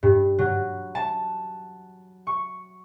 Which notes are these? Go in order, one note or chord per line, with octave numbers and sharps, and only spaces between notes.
G2
F#3
A5
C#6